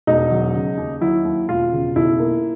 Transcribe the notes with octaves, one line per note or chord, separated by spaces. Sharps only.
E1 D#4
F#3
C#3
D#2
F#3 E4
D#2
E1 F4
C#3
B1 E4
A#3